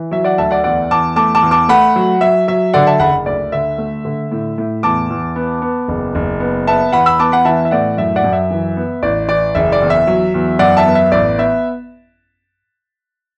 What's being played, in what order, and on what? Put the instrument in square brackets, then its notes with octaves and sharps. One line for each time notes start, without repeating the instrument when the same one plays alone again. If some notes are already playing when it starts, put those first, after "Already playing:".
Already playing: [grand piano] E3
F#3 E5
D5 F#5
D2 E5 A5
D5 F#5
E2 D5 F#5
E2 A5 D6
A3 A5 D6
A5 D6
E2
A5 D6
A3 F#5 B5
F#3
F#3 E5
F#3 E5
D3 D5 F#5
E5 A5
F#1 F#5 B5
D2 D5
D3 E5
A3
D3
A2
A2
E2 A5 D6
E2
B3
B3
F#1
F#1
B3
B3 E5 A5
E2 F#5 B5
B5 E6
B3 A5 D6
F#5 B5
E3 E5 A5
E5
A2 D5 F#5
F#2 E5
D5 F#5
F#2
E5
E3
B3
A1 D5
E3 D5
F#1 E5
D5
E2
E5
F#3
E2
F#2 D5 F#5
E5 A5
B3
E5
A1 D5
B3 E5